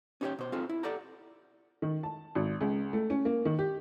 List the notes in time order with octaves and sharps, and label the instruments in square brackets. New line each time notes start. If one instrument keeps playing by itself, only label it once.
[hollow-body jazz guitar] C#4 D#4 G4 C5 C#5 G5
B2 C5
C4 D#4 F4 G#4 A4
E4
G4 A4 D5 F#5 G5 A#5
[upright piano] D#3
A5
G#1
C#2
A3
C#4
A#3
D#3
G4